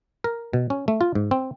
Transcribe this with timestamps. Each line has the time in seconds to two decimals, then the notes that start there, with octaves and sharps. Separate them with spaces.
0.24 A#4
0.53 B2
0.70 C#4
0.88 A3
1.01 F4
1.15 G#2
1.31 C4